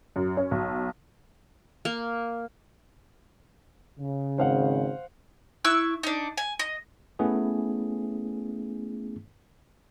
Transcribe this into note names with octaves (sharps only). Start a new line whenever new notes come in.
F#2
C#4
B1
A#3
C#3
G#1 C5 F5 F#5
E4 C#6 E6 F#6
D4 D#4
G#5
D#5
A3 B3 C#4 E4 G#4